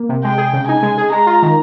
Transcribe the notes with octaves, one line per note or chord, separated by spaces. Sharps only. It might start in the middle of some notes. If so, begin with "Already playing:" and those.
Already playing: A#3
C3
G#3 G5
G#4
C#3
D#4 G#5
G#3
G#4
G#3 A#5
F4
D#3